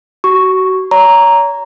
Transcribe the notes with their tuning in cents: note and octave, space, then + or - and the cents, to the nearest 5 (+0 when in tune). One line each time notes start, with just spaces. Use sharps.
F#4 +30 C#6 +0
C#5 +35 A#5 +0